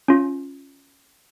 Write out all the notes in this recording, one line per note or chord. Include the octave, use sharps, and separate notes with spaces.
C#4 F4